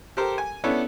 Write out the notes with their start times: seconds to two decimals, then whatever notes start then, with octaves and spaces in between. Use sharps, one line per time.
0.17 G4 A4 A#4 C5
0.38 G#5
0.64 B3 C#4 D4 E4 A4 C#5